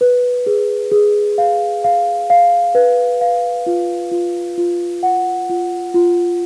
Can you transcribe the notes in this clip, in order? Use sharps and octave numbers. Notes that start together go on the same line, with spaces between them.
B4
G#4
G#4
F5
F5
F5
B4
F5
F4
F4
F4
F#5
F4
F4